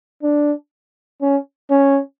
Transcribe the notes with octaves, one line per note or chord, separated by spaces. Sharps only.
D4
C#4
C#4